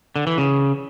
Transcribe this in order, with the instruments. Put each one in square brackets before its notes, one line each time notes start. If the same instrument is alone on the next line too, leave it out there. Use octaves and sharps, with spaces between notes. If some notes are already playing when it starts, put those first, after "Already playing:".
[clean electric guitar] D3
E3
C#3